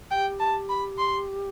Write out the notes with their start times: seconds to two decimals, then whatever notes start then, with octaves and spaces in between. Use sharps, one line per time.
0.11 G4 G5
0.40 A5
0.69 B5
0.98 C6